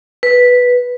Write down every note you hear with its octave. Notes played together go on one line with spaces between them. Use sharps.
B4